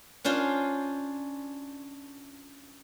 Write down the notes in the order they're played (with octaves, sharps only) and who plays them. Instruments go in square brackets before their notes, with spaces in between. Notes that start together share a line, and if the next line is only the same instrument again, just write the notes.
[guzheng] C#4 D4 F4 C5